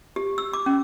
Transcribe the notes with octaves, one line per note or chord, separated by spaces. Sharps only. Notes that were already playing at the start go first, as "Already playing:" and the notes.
G4
E6
D6
C#4